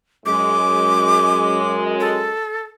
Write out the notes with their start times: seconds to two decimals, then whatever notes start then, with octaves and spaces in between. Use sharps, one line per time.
0.26 F#2 G#3 D6
2.00 A4